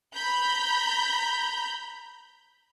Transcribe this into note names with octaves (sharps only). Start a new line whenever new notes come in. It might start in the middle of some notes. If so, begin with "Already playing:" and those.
A#5 B5 G6